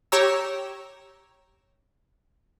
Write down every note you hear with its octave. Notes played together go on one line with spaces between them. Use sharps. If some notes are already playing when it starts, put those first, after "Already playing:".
G4 C#5 A#5 E6